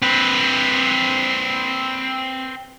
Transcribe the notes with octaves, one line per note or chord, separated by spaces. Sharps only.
C4 B4